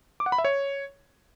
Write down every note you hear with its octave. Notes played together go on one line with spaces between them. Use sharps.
D6
F#5
B5
E5
C#5